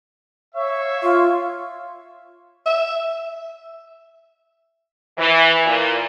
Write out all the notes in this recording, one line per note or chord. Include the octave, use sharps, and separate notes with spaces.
C#5 E5 F5 C#6
F4
E5
E3
A#2